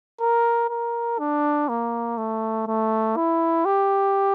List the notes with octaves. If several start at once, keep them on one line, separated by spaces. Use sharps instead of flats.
A#4
A#4
D4
A#3
A3
A3
E4
G4